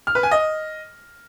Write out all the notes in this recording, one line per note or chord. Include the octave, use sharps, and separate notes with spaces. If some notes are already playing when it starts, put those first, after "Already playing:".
F6
B4
G#5
D#5